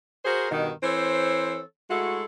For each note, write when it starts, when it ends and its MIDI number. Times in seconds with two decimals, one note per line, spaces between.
0.25 0.47 66
0.25 0.47 68
0.25 0.47 70
0.25 0.47 72
0.51 0.71 43
0.51 0.71 47
0.51 0.71 51
0.83 1.60 52
0.83 1.60 60
0.83 1.60 69
0.83 1.60 72
0.83 1.60 73
1.90 2.23 56
1.90 2.23 57
1.90 2.23 64
1.90 2.23 66
1.90 2.23 69